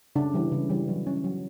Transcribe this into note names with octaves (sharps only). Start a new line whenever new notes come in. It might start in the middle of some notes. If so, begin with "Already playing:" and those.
C#3 D4
E3 G3
C#3
E3 G3
F#3
C#4
F#3